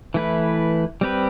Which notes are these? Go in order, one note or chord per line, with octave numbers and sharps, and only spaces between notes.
E3 A3 E4 B4
G3 C4 G4 B4